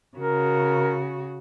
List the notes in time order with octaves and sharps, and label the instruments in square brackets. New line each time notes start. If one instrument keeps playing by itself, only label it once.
[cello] C#3 F#4 [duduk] A#4